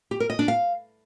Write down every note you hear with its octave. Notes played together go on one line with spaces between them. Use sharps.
G4
A#4
D#5
D4
F5